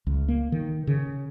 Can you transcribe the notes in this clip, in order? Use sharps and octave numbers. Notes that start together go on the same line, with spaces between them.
C#2
A#3
D#3
C#3